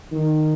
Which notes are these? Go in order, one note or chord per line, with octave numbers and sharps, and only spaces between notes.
D#3